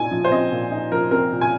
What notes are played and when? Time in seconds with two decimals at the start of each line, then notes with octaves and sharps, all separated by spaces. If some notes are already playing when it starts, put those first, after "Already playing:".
Already playing: A#2 D#4 G#5
0.11 F3
0.24 C5
0.31 C4 D#5
0.51 A#2
0.71 D#4
0.92 F3 A#4
1.11 C4 A#4
1.32 A#2
1.41 G#5